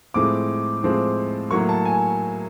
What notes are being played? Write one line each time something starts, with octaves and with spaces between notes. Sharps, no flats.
A2 F3 G#3 C4 D6
A2 F3 G#3 C4
A2 F#3 A#3 C#6
A5
G#5